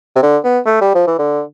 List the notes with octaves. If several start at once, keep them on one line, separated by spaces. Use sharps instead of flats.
C3
D3
B3
A3
G3
F3
E3
D3